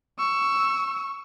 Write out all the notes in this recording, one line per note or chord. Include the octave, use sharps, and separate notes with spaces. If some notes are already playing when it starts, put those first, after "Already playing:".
C#6 E6